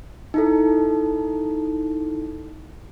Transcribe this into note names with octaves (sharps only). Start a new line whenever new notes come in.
D#4 E4 A4